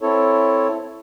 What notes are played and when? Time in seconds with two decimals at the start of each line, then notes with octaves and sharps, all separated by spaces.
0.01 C4 E4 A4 C#5